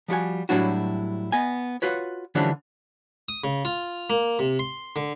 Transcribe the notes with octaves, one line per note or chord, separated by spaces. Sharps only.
F3 G3 F#4 G#5
A2 F#3 G3 D4 E4 F#4
B3 D#5 G#5
F4 F#4 B4 C#5
D3 E3 F3 G3 C#4 D4
D#6
C#3
F4
A#3
C3
C6
D3